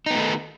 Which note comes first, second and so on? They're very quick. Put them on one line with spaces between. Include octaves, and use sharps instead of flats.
D#4 B3 A3 D#3